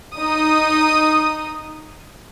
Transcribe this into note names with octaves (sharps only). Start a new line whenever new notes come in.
D#4 D#6